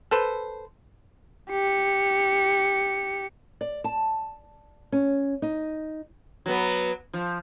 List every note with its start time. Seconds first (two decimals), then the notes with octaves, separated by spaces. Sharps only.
0.11 A4 B4 C5
1.50 G4 C#7
3.61 D5
3.84 A5
4.92 C#4
5.42 D#4
6.46 F#3 B3
7.13 F3